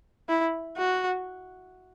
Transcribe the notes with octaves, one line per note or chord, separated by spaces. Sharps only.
E4
F#4